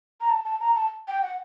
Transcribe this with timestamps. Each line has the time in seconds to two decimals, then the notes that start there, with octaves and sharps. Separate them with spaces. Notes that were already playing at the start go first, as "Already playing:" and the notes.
0.21 A#5
0.30 A5
0.45 A5
0.60 A#5
0.76 A5
1.08 G5
1.22 F#5